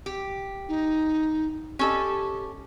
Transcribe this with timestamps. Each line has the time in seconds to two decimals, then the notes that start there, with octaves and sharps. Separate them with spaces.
0.06 G4
0.68 D#4
1.79 C#4 G4 A4 D#5